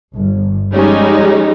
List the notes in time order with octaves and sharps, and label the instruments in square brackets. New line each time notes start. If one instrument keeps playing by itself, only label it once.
[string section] G1
F3 G3 G#3 C#4 D#4